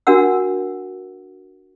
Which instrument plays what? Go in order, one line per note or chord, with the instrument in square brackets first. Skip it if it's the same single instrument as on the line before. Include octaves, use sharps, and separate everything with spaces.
[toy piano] D4 F#4 A#4 F#5 E6